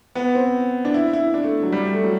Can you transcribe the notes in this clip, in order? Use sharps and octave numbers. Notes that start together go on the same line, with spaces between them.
B3
C4
D4
E4
E4
D4
A3
F#3
G3
A3
F#3